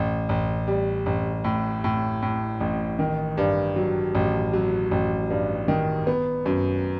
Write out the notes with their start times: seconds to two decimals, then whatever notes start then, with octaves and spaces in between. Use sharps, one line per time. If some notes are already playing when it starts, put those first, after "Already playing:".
Already playing: A1
0.29 A1
0.68 G3
1.06 A1
1.44 A2
1.84 A2
2.22 A2
2.60 A1
2.99 D#3
3.38 G2
3.76 F#3
4.15 A1
4.53 F#3
4.91 A1
5.30 G2
5.68 D#3
6.07 B3
6.46 F#2